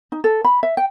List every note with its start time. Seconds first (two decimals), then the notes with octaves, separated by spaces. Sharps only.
0.12 D#4
0.24 A4
0.44 B5
0.63 E5
0.77 G5